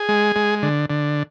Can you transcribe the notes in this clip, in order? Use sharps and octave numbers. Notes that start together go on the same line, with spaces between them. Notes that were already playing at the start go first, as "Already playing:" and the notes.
Already playing: G#4
G#3
G#3
D3
D3